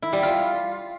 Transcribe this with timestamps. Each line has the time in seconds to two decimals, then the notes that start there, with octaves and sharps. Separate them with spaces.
0.02 E4
0.13 G3
0.23 F4